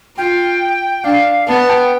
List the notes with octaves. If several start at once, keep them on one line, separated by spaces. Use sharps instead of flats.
F4 G5
D4 F5
B3 A5
G5